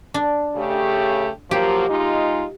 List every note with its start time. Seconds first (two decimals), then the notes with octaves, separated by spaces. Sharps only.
0.14 D4
0.56 C#3 A3 G4
1.51 F3 F#3 A#3 G4
1.88 G#3 D#4 F4